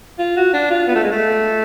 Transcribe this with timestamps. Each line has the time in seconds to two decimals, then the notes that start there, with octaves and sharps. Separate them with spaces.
0.19 F4
0.37 F#4
0.54 D4
0.71 F4
0.88 B3
0.95 A3
1.03 G#3
1.12 A3